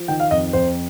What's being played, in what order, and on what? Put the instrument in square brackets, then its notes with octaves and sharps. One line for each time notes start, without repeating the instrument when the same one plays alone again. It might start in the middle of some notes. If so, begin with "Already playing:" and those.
Already playing: [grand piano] F3
D#3 G5
F5
F2 D#5
F2 C5